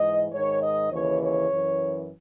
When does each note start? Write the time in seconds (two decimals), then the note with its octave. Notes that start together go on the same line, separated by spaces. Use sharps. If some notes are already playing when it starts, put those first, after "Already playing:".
Already playing: G#2 E3 D#5
0.31 G#2 D#3 C#5
0.61 D#5
0.91 D#2 C#3 E3 C#5
1.21 C#5
1.51 F#2 E3